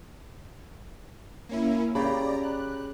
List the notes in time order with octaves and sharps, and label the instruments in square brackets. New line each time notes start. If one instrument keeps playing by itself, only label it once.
[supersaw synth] A#3 C#4 E4
[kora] C#3 [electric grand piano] G4 B5 [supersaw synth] D5 A#5
[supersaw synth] F#6